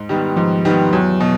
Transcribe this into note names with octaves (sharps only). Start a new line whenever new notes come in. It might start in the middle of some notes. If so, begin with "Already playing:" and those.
Already playing: G#2
D#3 G3 B3
G#2 F3
D#3 G3 B3
E2 F#3
B2